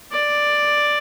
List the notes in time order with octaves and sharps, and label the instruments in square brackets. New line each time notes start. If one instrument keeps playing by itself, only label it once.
[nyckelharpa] D5